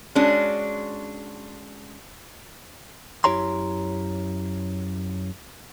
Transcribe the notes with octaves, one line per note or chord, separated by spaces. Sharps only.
G#3 C#4 D4 F#4
F#2 E4 G4 C#5 A#5 C6